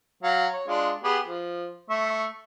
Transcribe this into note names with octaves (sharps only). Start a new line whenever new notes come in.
F#3 F5
C#5
G#3 D4 F4
B3 G4 G#4
F3
A3 E5 C#6